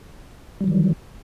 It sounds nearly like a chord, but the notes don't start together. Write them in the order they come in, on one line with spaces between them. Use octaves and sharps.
G3 F#3 D#3 E3